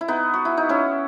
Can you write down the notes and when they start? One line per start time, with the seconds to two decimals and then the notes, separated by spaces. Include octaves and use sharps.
0.01 E4
0.08 B3 D#4
0.34 F#4
0.45 E4
0.57 D#4
0.69 C#4 E4